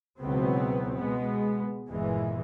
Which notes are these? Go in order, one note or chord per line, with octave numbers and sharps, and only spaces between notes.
C#2 B2 E3 F#3 B3 C4
B2 G#3 B3
G1 E2 A#2 E3 G#3